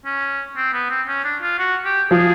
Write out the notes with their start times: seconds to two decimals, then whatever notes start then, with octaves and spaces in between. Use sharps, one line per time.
0.05 C#4
0.57 C4
0.73 B3
0.90 C4
1.08 C#4
1.24 D4
1.42 F4
1.59 F#4
1.85 G4
2.10 F3 G#4